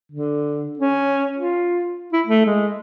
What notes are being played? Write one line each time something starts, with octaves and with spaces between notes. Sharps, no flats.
D3
C#4
F4
E4
A3
G#3